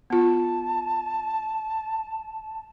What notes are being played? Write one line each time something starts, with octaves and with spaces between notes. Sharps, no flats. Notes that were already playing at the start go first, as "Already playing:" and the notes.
B3 F4 A5